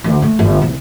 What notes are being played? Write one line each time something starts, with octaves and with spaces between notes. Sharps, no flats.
D2
A3
G1
C2